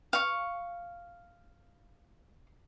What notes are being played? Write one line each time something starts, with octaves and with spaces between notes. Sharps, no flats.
F5 C#6